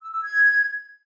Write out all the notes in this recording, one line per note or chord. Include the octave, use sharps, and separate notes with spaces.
E6
E6
G#6